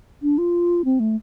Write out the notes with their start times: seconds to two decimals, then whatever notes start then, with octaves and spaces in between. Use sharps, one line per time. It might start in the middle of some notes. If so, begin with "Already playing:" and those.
0.22 D4
0.38 F4
0.85 C4
1.00 A3